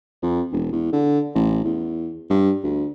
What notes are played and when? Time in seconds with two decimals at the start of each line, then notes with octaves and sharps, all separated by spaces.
0.22 F2
0.52 E1
0.73 E2
0.93 D3
1.35 A1
1.64 E2
2.30 G2
2.64 D2